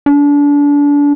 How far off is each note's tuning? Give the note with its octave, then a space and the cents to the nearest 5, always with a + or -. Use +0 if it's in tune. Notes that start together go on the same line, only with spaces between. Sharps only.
D4 -30